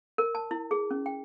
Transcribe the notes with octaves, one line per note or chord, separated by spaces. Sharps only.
A#4
A5
E4
G#4
C#4
G5